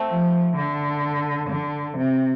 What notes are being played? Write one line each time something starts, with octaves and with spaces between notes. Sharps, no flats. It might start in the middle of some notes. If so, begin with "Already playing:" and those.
Already playing: A3 C4
F3
D3
D3
C3